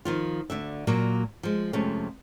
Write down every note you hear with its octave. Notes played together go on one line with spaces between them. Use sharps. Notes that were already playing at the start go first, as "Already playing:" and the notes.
D#3 F3 F4
D2 A#2 D3 E5
A#2 F#3 A#3
F3 G#3
F2 C3 F3 G#3 A3 C#4